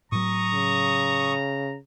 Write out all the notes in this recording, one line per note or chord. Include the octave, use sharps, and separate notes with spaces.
A2 F#3 A#5 C#6 D#6
C#3